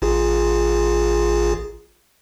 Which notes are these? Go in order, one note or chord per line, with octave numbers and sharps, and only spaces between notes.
A1 F4 G#4